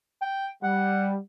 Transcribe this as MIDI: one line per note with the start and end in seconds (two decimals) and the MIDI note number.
0.21 0.47 79
0.63 1.17 55
0.63 1.12 78